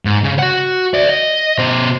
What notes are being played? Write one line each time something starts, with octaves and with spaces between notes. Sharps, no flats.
G#2
C#3
F#4 F#5
D5 E5
D#5
B2 C5